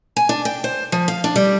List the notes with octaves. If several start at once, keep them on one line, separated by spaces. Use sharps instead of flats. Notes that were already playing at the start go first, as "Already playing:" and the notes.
G#5
D4
G5
C5
F3
F5
D4
G3